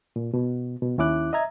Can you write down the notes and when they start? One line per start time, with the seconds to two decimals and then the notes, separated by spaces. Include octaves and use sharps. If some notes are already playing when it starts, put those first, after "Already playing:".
0.16 A#2
0.34 B2
0.82 B2
0.98 D#2 C#4 E4 D6 F#6
1.33 D#5 E5 A#5 G#6